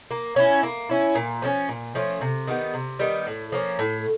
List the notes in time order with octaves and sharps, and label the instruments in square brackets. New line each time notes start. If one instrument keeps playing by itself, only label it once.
[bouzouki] A#3
C#4 E4
A#3
C#4 E4
A#2
F3 A3 C#4
A#2
F3 A3 C#4
C3
D#3 G3 B3
C3
D#3 G3 B3
A2
F3 A#3 C#4
A2